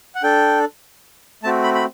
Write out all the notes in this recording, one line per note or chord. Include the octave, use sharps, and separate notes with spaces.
F#5
D4 A4 G5
A3 C4 F#4 A5
B5
B5